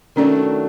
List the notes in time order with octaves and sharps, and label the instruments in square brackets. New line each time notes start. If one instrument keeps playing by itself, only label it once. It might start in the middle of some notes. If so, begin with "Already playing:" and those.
[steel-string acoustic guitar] D#3 F#3 A3 D4 [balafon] C#4